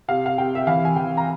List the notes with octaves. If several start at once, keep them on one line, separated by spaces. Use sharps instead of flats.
C3 F5
F5
C3 G5
E5
E3 F5
G#5
E3 G5
A#5